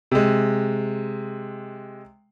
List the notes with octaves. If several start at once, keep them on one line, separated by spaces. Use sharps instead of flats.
C3 G#3